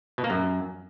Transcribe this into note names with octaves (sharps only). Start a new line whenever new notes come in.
B2
A#3
F#2